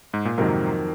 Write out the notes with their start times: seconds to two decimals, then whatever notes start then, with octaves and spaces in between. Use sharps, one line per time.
0.14 G#2
0.25 A#2
0.38 F2 G#2 C3 D#3 F#3 A#3